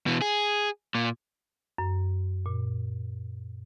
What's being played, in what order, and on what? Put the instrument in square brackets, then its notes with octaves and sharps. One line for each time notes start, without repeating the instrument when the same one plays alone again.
[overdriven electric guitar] B2 E3
G#4
A#2
[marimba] F#2
A#2